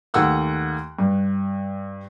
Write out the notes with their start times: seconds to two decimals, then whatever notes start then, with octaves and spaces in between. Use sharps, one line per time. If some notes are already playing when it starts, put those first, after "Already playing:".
0.14 D#2 A3 F#5 E6 F#6
0.99 G2